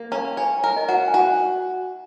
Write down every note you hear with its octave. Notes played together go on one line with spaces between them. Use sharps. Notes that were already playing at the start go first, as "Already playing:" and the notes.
Already playing: A#3
C#4 A#5
C#5 G#5
A#4
D#5
F#4 F#5
G#5
F#4 F#5